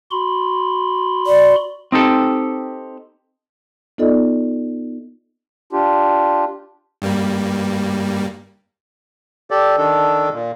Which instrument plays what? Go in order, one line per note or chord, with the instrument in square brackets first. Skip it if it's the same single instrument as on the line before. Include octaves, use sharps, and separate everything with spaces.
[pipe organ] F#4 B5 C6
[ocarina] D5
[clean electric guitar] C4 D#4 G4 A4
[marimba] B3 D#4 F4 A4 D5 D#5
[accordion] D4 F4 G4
[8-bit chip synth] G2 G3 A#3
[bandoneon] G4 A4 D5
D#3 D4 A4
A#2